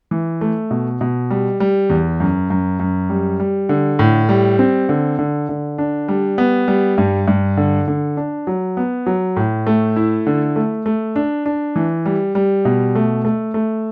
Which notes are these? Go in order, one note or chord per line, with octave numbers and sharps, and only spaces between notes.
E3
A3
B2
B2
G3
G3
E2
F#2
F#2
F#2
G3
G3
D3
A2
G3
C4
D3
D3
D3
D4
G3
B3
G3
G2
G2
D3
D3
D4
F#3
B3
F#3
A2
A3
E4
D3
A3
A3
D4
D4
E3
G3
G3
B2
A3
A3
A3